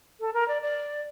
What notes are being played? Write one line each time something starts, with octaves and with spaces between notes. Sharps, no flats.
A4
A#4
D5
D5